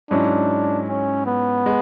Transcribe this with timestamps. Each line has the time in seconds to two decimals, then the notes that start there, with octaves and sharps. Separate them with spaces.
0.11 G#2 F#3 C#4 D4 E4
0.89 C#4
1.26 B3
1.66 G#3